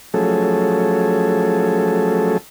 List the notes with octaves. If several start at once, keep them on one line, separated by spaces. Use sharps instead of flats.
F3 F#3 A3 C#4 G#4 A4